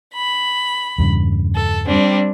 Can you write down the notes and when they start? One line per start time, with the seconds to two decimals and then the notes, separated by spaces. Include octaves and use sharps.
0.14 B5
0.98 E2 G2 C#3
1.55 A4
1.87 G3 C4 D4